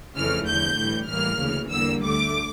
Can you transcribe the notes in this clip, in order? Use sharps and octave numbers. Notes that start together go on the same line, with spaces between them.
F2 C#3 E3 A3 F6
E2 D3 F3 G6
A2 E3 G3
A2 E3 G3 A#3 F6
D2 C#3 E3
E2 D3 G3 A#3 E6
D2 D3 A3 D6